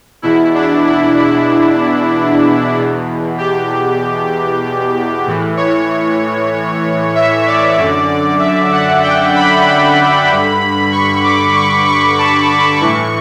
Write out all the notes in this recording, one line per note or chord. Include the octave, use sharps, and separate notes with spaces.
E2 B2 E4
D4
E4
E4
E2 B2
G4
A2 E3
C#5
E5
D5
F#2 D3
E5
F#5
G5
B5
B5
G2 D3
C#6
D6
C#6
C#6
A5
B5
A2 E3 C#6